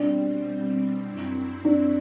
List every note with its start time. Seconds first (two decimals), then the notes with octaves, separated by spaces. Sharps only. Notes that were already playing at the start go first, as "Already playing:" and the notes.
Already playing: B2 G3 C4 D4
1.05 F#2 F#3 C4 E4
1.65 D4